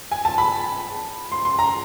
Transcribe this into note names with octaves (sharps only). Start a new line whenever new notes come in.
G#5
A5
B5
C6
C6
A#5